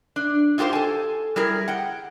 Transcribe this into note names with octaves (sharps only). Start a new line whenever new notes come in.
D4
D#4 F4 G4 A#4 C5
A4 G#5
G3 E4 G#4 A#4
F#5 G5